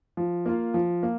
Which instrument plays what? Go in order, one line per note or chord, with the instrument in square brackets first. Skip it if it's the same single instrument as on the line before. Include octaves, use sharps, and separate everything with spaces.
[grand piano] F3
A#3 F4
F3
A#3